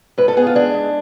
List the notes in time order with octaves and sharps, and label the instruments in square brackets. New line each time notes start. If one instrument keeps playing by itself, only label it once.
[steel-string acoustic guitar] G#2 B4
A4
B3 G#4
F4
G#3 D4
G#2